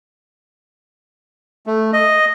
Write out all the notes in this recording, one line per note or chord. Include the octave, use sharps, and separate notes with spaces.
A3
D#5